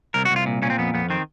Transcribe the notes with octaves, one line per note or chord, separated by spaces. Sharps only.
C2 A#4
F#4
C2
F4
A#2
A#2 C#4
C4
F2 B3
F2 B3
D#3 C4